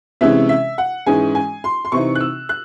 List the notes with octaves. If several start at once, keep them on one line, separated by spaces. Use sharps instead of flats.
C3 E3 G#3 C#4 E5
E5
F#5
G#2 E3 G#3 C#4 G#5
G#5
C6
C6
C3 E3 C4 D#4 C#6
F#6
E6
F#6